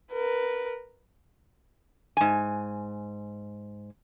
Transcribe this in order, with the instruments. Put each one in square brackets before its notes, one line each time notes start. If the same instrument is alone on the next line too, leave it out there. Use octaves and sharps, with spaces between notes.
[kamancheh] A#4 B4
[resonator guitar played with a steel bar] G#2 G#5